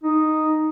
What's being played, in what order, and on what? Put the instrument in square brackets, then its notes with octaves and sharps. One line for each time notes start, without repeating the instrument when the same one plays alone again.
[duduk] D#4